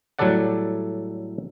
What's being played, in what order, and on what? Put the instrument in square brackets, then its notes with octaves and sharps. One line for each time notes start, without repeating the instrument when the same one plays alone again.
[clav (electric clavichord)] A2 F#3 G3 A4 D5 F#5